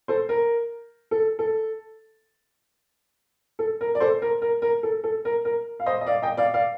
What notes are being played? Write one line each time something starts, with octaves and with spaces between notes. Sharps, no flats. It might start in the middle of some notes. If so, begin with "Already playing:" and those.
A4 C5
A#4
A4
A4
A4
A#4
D5
A4 C5
A#4
A#4
A#4
A4
A4
A#4
A#4
F5
C5 D#5
D#5
D5 F5
D#5 G5
D5 F5
D5 F5